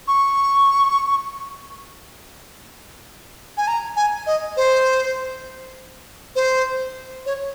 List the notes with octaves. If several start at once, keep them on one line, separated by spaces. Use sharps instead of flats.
C#6
G#5
A#5
G#5
D#5
C5
C5
C#5